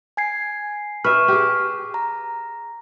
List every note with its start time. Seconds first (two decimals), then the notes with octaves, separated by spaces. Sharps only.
0.17 G#5 G#6 C7
1.05 B4 E5 C#6 F6
1.28 G4 G#4
1.94 A#5